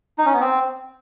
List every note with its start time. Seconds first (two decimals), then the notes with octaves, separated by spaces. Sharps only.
0.18 D#4
0.26 C#4
0.33 B3
0.41 C4